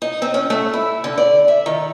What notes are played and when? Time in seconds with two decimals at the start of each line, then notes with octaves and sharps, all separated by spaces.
0.02 D#4
0.22 C4
0.34 C#4
0.50 A3
0.73 E4
1.04 D3
1.18 D5
1.48 E5
1.66 D#3